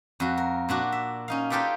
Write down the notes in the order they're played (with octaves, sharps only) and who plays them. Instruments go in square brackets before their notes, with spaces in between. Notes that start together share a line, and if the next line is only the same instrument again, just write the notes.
[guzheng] F2 F#4
A#4
A#2 D4 F#4
E5
C#4 D#4 F5
D#4 F4 G4 A4 B4 D5